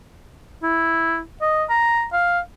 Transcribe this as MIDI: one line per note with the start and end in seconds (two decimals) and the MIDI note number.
0.63 1.20 64
1.42 1.64 75
1.70 2.05 82
2.12 2.40 77